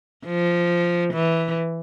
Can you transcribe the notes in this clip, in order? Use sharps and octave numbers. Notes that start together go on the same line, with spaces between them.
F3
E3